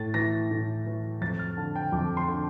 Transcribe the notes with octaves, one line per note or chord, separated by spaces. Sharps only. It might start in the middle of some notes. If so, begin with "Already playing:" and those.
Already playing: A2 A6
E3 A#6
A2
E3
F2 A6
F6
D3 A5
G5
F2 D6
C6
D3